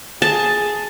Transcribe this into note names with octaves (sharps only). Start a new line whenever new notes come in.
G#4 A5